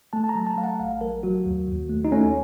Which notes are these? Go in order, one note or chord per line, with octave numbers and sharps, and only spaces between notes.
A3 A5
A5
A#5
F#3
A5
A3 F5
F#5
A1 F5
F#3 A#4
F#3 F#4
D#2
D#2
A3
D#4
A3 C#4